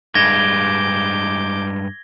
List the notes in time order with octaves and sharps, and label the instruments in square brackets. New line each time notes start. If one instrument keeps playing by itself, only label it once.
[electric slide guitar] G2 G#3 [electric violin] D6 G6 [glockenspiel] G#6 A#6 G7